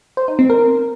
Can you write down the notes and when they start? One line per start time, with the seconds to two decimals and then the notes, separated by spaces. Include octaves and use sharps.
0.17 C5
0.28 D#4
0.39 C4
0.50 A#4